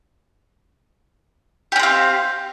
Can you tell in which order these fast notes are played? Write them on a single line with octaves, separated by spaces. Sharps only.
G4 C#4 C4 F5